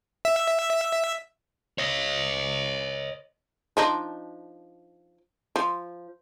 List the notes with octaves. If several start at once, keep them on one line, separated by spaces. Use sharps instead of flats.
E5
C#5 D#5
F3 D4 D#4
F3